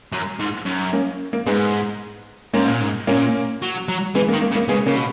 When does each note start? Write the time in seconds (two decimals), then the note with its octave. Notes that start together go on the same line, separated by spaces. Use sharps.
0.12 F#2
0.40 G#2
0.65 F#2
0.93 A#3 C#4
1.33 A#3
1.46 G#2 G#3 B3
2.54 G#2 A#3 C#4
2.68 A#2
2.81 G#2
3.07 A#2 A#3 C#4
3.62 F#3
3.88 F#3
4.15 E3 G#3 B3
4.28 A#3
4.33 D#3
4.42 A#3
4.51 C#3
4.55 A#3
4.68 C#3 G#3 B3
4.86 C#3 A#3 C#4
4.96 B2